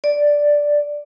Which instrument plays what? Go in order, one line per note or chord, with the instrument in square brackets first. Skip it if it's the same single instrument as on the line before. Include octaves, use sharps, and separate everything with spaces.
[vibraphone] D5